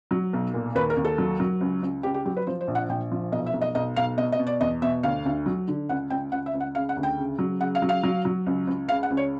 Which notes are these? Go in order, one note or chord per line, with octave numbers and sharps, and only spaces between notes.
F#3
B1
A#2
D#2 B4
A#4
D#2
A4
F#3
F#3
C#2
C#2
C#2 G4
G4
F#3 G4
B4
F3 C5
C5
A#1
F#5
A#1 G5
F3
B1 D#5
E5
B1
D#5
B1 D#5
B1 F5
B2 D#5
D#5
B2
D5
E2 D#5
B2 E5
D2 F5
D2
F#3
D3
C#2 F#5
C#2 G5
C#2 F#5
E5
C#2
F#5
C#3 F5
F#5
D2
G5
C#3
F#3
C#3 F#5
F5
F#3
F5
F#3
F#3
C#2
C#2
C#3 F5
F#5
C#2
C#5